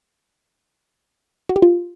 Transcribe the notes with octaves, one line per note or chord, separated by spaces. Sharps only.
F#4
G4
F4